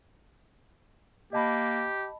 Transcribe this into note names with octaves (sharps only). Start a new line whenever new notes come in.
A#3 G4 D#5 A5 B5